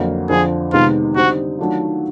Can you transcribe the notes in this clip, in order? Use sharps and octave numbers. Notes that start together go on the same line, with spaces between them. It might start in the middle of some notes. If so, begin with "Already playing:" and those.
Already playing: F2 D3 F#3 A#3
F2 D3 F3 G#4
C3 D#3 G#3 B3 D#4 F4
D3 G3 C4 D#4 F#4
D#3 F#3 A3 D4 F4